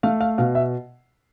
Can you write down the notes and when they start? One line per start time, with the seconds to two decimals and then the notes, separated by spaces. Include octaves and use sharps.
0.03 A3 F5
0.20 F5
0.38 B2 F5
0.55 E5